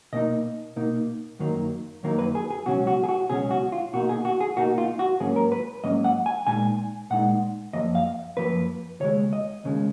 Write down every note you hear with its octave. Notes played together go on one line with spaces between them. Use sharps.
B2 A#3 D#4 D#5
B2 A#3 D#4
F#2 D#3 F#3 A#3 D#4
F#2 D#3 F#3 A#3 D#4
B4
G#4
G#4
C#2 B2 F#3 C#4 F#4
F#4
G#4
F#4
C#2 B2 F#3 C#4 G#4
F#4
F4
B2 A#3 D#4 F#4
G#4
F#4
G#4
B2 A#3 D#4 F#4
F4
F#4
G#2 F#3 A#3 C#4 G#4
A#4
B4
G#2 F#3 A#3 C#4 D#5
F#5
G#5
A#2 G#3 D#4 G#5
A#2 G#3 D#4 F#5
F#2 F3 A#3 D#5
F5
F#2 F3 A#3 B4
D#2 C#3 G#3 C#5
D#5
D#2 C#3 G#3